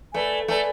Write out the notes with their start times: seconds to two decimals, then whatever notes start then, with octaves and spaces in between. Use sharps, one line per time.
0.14 A3 B4 D5 G#5
0.48 A3 B4 D5 G#5